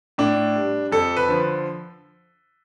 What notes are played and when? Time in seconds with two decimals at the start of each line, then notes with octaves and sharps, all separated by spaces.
0.18 A2 D4
0.56 G3
0.92 F2 A4
1.17 B4
1.29 D3 F3